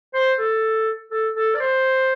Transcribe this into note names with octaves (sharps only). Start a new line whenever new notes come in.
C5
A4
A4
A4
D5
C5